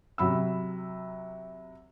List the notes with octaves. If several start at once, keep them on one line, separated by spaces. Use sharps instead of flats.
C3 F#3 B5 E6